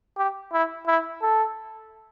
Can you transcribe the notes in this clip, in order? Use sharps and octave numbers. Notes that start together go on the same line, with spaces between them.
G4
E4
E4
A4